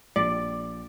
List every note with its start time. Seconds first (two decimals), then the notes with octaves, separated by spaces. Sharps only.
0.16 A#1 D5